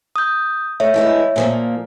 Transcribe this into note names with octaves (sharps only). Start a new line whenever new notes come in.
D#6 G6
A3 C#5 E5
E3 G#3 E4
A#2 F3 A#3